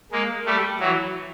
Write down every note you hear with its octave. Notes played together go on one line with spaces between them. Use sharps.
G#3 A#3
G3 A3
E3 F#3